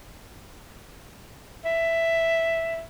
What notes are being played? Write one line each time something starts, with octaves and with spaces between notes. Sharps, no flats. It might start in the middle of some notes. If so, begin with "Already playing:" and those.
E5